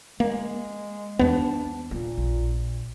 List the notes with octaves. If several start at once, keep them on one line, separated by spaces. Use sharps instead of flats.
G#3 A#3
D#2 B3 D4
A#2 A#3
A#1